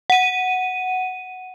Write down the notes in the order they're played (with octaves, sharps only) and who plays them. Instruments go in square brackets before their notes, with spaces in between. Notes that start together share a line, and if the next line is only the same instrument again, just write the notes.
[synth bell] F#5 D#7